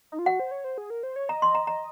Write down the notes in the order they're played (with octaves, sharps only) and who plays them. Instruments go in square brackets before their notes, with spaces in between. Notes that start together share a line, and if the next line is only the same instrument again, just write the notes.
[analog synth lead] D#4
F4
[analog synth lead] F#4 [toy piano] F#5
[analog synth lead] C5
C#5
C5
G#4
A#4
C5
C#5
[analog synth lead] D#5 [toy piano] A#5
[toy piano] C6
A#5
A#5